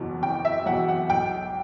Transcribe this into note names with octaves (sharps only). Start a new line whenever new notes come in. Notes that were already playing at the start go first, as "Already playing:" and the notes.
Already playing: F#1 E2 B2 F#3
F#1 G5
E5
E2 B2 F#3 F#5
F#5
B1 G5